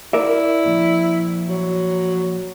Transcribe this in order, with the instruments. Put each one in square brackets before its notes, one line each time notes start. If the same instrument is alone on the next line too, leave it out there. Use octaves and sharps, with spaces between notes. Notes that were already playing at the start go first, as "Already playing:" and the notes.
[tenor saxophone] E4 [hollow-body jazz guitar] A#4 D5 E5
[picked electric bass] F3 A#3
[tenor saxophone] F#3